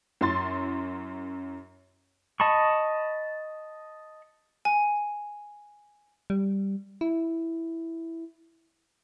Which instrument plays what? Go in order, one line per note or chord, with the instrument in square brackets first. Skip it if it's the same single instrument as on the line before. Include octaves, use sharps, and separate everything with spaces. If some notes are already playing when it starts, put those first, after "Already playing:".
[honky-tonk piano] F#2 C#4 E4 C6 A6
[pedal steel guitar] D#5 A5 B5 C#6
[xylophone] G#5
[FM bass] G3
E4